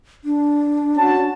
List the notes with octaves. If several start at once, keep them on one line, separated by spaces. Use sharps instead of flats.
D4
C#4 F#4 A5